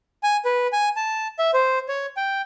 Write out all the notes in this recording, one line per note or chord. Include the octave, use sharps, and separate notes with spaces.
G#5
B4
G#5
A5
E5
C5
C#5
G5